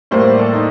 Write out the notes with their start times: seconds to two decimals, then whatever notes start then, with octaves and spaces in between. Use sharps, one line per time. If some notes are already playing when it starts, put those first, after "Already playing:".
0.11 A2 G3 A#3 C5
0.25 D5
0.39 A4
0.53 D#4